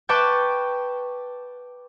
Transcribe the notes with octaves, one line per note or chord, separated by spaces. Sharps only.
B4 G5 A5 C#6 D6 G6